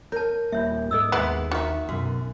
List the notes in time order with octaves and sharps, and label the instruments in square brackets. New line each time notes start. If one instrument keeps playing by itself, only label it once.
[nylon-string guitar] A#4 [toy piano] C#5 A5
[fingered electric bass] D#2 G3 A#3 [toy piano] F4 C#5 E5
[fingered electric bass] G#2 [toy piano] A4 D#5 E6
[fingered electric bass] D#2 [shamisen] G#3 B3 E4
[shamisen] D#3 [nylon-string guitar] F#4 E5
[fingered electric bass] B1 B2 [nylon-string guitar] F#2 [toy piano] F#4